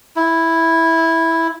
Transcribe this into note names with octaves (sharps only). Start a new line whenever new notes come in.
E4